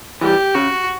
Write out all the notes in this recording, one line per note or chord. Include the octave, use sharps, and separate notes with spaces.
E3 G3 G4
C#3 F#4